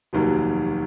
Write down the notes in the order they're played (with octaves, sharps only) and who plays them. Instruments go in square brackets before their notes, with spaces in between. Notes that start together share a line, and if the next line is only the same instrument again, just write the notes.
[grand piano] F1 D#2 D#3 F#3 A#3